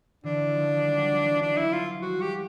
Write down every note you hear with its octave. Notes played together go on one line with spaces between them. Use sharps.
D3 E3 D4
D#3 F3
G3
F#3
F3
E3 F#3
D4
E4
F4
F3 G3 F#4
F#3 G#3 G4